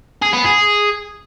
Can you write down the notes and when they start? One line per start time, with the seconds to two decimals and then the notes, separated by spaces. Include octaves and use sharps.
0.22 G#4
0.34 B3
0.45 G#4